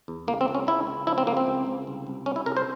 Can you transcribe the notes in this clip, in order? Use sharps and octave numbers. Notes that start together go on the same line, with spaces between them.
E2
C#2 A#3
C4
C#2
C#4
C#2 E4
C#2
F3 E4
C4
C#2 A#3
C4
C#2
C#2
C2
C2
G3 C#4
E4
C2 A#4
C5